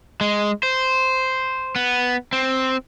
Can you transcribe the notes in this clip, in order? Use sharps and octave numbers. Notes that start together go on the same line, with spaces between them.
G#3
C5
B3
C4